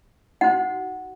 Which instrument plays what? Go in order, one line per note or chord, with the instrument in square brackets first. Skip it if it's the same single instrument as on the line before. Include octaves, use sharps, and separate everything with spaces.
[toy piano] D#4 F#4 C5 F#5